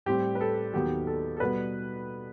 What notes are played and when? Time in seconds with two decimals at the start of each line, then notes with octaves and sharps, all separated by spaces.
0.06 A2 G3 C4 G4
0.35 B4
0.41 A4
0.73 D#2 D#3 F#3 B3 G4
1.07 A4
1.37 A4
1.40 B2 G3 B3 B4